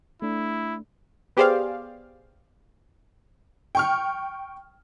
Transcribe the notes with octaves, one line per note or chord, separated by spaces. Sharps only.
A3 D4 E4
B3 G4 G#4 C5 D5 F5
G5 C#6 F6